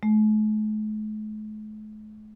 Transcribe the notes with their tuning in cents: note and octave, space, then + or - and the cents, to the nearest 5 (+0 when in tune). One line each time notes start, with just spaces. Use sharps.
A3 -45